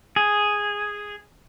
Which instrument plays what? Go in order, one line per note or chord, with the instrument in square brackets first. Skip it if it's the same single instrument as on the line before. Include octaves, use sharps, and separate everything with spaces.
[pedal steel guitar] G#4